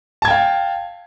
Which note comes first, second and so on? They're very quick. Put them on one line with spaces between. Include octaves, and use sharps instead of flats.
A5 G#6 G5 F5